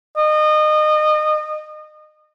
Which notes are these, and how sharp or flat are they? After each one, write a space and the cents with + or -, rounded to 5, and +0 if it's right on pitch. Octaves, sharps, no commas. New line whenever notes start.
D#5 -30